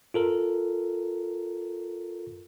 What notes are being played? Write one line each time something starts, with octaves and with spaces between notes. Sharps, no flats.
F4 A4 A#4